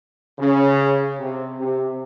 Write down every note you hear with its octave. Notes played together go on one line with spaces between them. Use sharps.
C#3
C3
C3